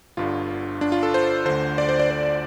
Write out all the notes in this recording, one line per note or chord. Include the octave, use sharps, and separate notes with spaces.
G1 G2 D3 F4
D4
F4
A4
C5
D2 D3 C5
D5
C5
D5
C5